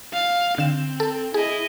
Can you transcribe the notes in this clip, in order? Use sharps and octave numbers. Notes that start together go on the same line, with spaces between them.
F5
D3 C4 E7
A4
E4 G#4 D#5